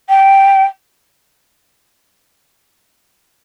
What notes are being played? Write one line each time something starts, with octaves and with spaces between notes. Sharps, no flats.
G5